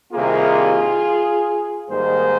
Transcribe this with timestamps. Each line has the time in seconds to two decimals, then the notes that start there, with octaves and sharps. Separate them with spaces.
0.13 C2 C3 D#3 A#3 F4 G#4
1.89 G#2 D#3 G3 A#3 G#4 C5